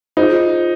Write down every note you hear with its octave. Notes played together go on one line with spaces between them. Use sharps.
D#4 F4 G#4 C5